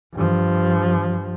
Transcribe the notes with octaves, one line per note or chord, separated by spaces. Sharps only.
G2 F3